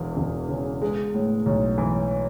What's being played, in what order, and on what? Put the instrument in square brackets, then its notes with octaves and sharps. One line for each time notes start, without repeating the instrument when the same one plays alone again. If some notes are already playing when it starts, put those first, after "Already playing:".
Already playing: [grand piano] E1 E2
E1
C#3
G#3
A2
B1
E3